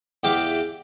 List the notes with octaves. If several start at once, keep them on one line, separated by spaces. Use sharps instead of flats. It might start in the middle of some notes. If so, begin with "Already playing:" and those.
E2 G4 E5 F5 D6